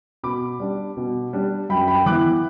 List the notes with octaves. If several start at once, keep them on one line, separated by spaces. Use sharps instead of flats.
B2 B5 D6
G3 D4
B2
G3 D4
F#2 G5 B5
G5 B5
E3 B3 E4 D6 F#6